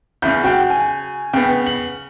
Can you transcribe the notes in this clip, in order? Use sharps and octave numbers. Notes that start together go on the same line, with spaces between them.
E2 C#3 G6
C#3 F#4 G5
G#5
C#3 B3 G5
F#7